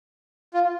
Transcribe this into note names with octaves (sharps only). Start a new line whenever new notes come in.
F4